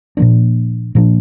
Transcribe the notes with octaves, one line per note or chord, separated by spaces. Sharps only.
A#2 F3 A#3 D4
A#2 F3 A#3 D4